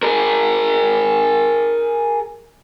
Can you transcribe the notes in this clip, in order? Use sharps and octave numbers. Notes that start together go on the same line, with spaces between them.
G#4 A#4